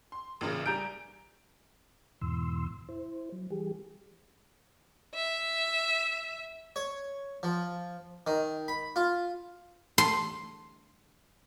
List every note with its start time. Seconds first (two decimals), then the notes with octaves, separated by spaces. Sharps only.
0.12 C6
0.41 A1 A#2 C#3
0.66 G3 G#5 A#5 G6 D7
2.21 E2 G#2 B2 E3 C6 E6
2.89 E4 C5
3.32 F#3
3.50 E3 G3 G4 G#4
5.15 E5
6.76 C#5
7.43 F3
8.27 D#3
8.68 B5
8.96 F4
9.98 C6